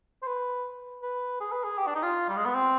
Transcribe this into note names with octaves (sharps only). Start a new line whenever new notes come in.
C5
B4
B4
G#4
B4
G#4
G4
D4
D#4
F4
G3
G#3
B3
C4